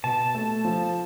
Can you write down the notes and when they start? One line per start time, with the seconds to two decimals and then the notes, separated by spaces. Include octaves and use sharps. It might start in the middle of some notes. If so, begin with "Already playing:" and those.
0.04 B2 A5
0.35 A3
0.65 F3